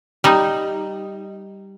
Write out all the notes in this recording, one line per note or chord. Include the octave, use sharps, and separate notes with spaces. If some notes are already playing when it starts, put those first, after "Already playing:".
G3 D#4